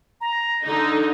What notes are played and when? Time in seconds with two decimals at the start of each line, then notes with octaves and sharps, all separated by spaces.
0.21 A#5
0.62 D3 D#4